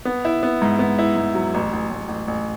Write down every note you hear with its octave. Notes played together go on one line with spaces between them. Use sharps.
B3
E4
B3
G#2
B3
E4
G#2
F#3
A1
A1
A1
A1
A1